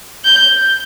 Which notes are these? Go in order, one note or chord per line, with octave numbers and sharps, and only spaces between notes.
G6